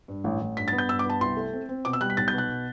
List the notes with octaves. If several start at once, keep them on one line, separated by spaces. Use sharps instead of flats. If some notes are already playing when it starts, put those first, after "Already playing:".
G2
A1
A1
G2 B6
A6
B3
G6
G2 E6
D6
B3 A5
C2 C6
A3
C4
C4
B2 D6
E6
G3 F#6
B6
B1 A6
G6
B2
F#6